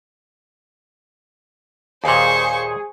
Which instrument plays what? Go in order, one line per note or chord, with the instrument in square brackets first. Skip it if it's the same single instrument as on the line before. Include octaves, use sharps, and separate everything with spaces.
[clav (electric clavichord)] D#2 A#2 [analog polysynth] G#4 [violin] C5 C#6